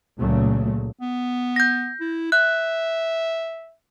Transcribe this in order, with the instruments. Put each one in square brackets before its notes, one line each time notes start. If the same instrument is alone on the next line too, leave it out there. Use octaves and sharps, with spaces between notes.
[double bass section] C#2 A#2 C#3 F#3 A3
[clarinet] B3
[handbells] G6 A#6
[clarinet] E4
[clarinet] E5 [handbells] F#6